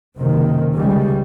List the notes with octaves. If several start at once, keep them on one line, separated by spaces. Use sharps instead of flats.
F#1 C3 D#3
C#2 C#3 G3 G#3